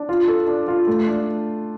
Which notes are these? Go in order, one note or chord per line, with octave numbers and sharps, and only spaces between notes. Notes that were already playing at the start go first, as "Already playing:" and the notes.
Already playing: D4
F4
A4
D4
F4
A3
D4